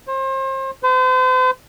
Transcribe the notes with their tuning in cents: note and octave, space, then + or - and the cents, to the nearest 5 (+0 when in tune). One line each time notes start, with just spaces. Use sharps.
C5 +35
C5 -40